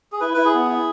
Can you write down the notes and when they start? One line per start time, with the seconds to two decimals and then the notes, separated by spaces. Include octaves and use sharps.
0.12 G#4
0.21 E4 B4
0.34 E4 B4
0.45 G#4
0.54 B3
0.69 E4